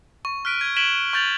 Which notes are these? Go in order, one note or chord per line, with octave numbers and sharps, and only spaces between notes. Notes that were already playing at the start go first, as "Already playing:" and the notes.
C#6
F6 F#6 B6 D7 D#7
G#6 G7
G#6 B6 D7 E7 F#7 G7
C#6 G6 A6 F7 F#7